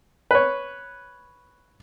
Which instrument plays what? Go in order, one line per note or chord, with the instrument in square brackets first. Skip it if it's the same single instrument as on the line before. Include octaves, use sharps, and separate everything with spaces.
[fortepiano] B4 C#5